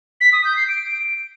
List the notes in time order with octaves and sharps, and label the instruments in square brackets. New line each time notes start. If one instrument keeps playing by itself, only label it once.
[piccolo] B6
D#6
G6
C7
D7